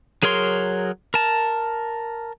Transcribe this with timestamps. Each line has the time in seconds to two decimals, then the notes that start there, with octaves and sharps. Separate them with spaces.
0.23 F#3 G#4 A#4 C#5 C6
1.14 A#4 A5